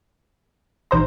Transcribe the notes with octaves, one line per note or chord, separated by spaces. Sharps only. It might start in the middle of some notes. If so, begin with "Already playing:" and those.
A1 D#4 C5 A#5 C6